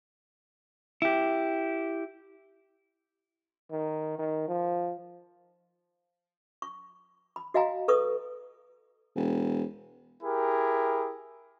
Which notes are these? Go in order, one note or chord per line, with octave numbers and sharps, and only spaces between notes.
E4 G4
D#3
D#3
F3
C#6
B5
F#4 D#5 F5 G#5 A#5
A4 B4 C#6 D#6
E1
E4 G4 G#4 A#4